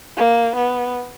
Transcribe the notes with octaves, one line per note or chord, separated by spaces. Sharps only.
A#3
B3